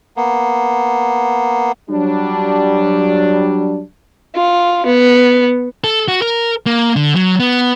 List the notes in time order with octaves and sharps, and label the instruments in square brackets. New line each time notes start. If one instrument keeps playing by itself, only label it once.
[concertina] A#3 B3
[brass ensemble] F#3 G3 D4
[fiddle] F4
B3
[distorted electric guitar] A4
F#4
A#4
A#3
D3
F#3
B3